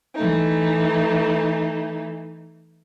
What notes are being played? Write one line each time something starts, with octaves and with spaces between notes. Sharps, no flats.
E3 A3 D#4